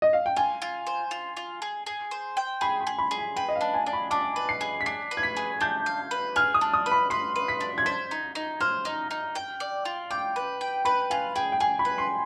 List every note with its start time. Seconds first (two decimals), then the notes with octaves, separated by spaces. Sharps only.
0.02 D#5
0.13 F5
0.26 G5
0.36 F4 G#5
0.62 F4
0.87 C5
1.11 F4
1.37 F4
1.62 G#4
1.86 G#4
2.11 C5
2.37 G5
2.61 G#4 B5
2.80 C6
2.87 G#4
2.98 B5
3.11 G#4
3.18 G#5
3.36 B4 G5
3.48 D#5
3.55 F5
3.61 D4
3.74 G#5
3.86 D4
3.93 B5
4.11 D4 D6
4.36 B4
4.49 C7
4.61 G#4
4.81 B6
4.86 D4 C7
5.11 B4
5.17 G#6
5.23 B6
5.37 G#4
5.61 D4 G6
5.86 F5
6.11 B4
6.36 G#4 F6
6.54 D#6
6.61 D4
6.74 D#6
6.86 B4
6.92 B5
7.10 B4 C6
7.36 B4
7.48 B6
7.61 D4
7.78 G#6
7.86 C5 B6
8.11 D#4
8.35 D#4
8.61 C5 F6
8.85 D#4
9.11 D#4
9.35 G5
9.60 D5
9.85 F4
10.11 G5 D6
10.36 B4
10.61 G5
10.85 B4 B5
11.10 F4 G#5
11.36 G#4 G5
11.52 G5
11.60 G#4 G#5
11.79 B5
11.85 B4
11.98 C6